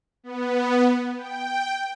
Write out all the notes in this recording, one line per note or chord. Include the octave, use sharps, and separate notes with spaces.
B3
G5